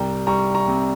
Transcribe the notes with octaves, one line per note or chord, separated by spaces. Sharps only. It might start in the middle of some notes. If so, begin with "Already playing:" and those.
Already playing: C2 G3 G5 A#5
G3 A#5 C#6
A#5 C#6
C3